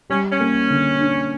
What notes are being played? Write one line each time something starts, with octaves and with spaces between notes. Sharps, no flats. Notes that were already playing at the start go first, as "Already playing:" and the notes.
G3 C#4
C#4
A#3
D3
D4